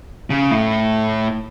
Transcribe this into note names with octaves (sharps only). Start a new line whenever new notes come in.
C#3
A2